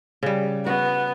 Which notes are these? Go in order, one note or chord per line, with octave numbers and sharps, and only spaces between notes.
C#3 G3
B3 F#4